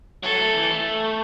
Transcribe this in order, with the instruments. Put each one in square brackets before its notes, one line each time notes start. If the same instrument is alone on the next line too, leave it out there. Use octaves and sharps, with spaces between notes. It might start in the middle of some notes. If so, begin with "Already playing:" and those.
[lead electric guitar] F#3 [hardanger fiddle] A4
[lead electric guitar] A3
E3
A3